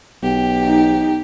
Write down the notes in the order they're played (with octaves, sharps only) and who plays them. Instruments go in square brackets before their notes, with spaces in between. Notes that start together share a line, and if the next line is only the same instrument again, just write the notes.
[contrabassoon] B1 [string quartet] G4
[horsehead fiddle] D#4